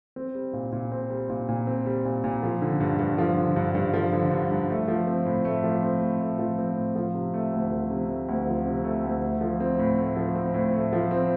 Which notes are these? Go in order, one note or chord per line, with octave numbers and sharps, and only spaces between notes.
C4
G3
A#2
A#2
C4
G3
A#2
A#2
C4
G3
A#2
A#2
F3
D3
G2
G2
F3
D3
G2
G2
F3
D3
G2
G2
A3
F3
C4
A2
A3
F3
C4
A2
A3
F3
C4
A2
F3
C3
A3
D2
F3
C3
A3
D2
F3
C3
A3
D2
A3
F3
C4
A2
A3
F3
C4
A2
A3
F3
C4